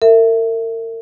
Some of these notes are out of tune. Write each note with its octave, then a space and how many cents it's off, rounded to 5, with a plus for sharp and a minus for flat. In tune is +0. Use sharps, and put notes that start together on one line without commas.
A#4 -40 E5 +0